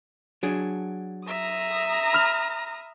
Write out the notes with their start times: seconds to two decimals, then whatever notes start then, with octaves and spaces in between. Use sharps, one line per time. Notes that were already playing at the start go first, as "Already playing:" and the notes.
0.43 F#3 D4 G#4
1.28 E5 A#5 D#6
2.13 B5 F6 F7